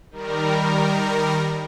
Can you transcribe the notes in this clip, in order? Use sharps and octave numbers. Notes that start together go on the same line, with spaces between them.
D#3 G3 A#4